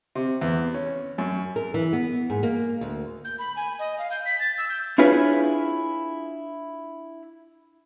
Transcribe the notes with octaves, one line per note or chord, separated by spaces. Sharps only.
C3
E2
C#4
F#2
A#4
E3
B3
G#2
A#3
D2
G6
B5
G#5
D#5
F5
G6
B6
A6
E6
G6
D4 E4 F4 G#4 B4 C#5